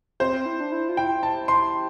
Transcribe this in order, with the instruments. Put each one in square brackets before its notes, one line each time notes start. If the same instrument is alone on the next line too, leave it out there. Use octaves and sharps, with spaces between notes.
[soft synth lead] C4 [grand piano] C5
[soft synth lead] E4
D4
E4
F4
[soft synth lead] E4 [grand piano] G5
[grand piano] A5
C6